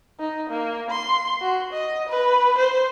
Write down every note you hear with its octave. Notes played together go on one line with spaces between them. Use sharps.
D#4
A#3
C6
F#4
D#5
B4
C5